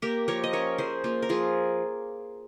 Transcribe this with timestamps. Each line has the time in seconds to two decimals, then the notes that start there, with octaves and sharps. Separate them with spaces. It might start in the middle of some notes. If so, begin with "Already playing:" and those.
0.02 A#3 G4 A#4
0.28 F3 A#4 C#5
0.44 D#5
0.53 C#4 A#4 C#5
0.78 F3 G#4 C5
1.04 A#3 F4
1.22 A#4
1.29 F3 F4 G#4